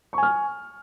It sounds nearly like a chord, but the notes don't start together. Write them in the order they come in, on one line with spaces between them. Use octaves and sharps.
C#6 G#5 F6